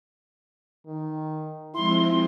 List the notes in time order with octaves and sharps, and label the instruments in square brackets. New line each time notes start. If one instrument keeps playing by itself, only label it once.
[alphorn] D#3
[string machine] F3 G#3 C4 [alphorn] E4 [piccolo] C6